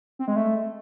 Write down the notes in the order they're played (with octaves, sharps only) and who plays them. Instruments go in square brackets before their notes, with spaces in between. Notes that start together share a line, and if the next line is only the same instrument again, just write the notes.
[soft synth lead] C4
G#3
A3